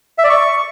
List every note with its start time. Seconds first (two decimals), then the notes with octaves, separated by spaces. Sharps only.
0.18 E5
0.24 D5
0.29 C#6